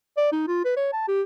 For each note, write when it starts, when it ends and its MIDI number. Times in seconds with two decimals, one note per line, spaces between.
0.17 0.31 74
0.32 0.43 63
0.48 0.60 65
0.65 0.73 71
0.77 0.89 73
0.93 1.05 81
1.08 1.22 67